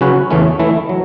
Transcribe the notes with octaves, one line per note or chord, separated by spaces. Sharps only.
C#3 F#3 C#4 F#4 B4
E2 C#3 E3 A3 C#4
E3 A3 E4
F#3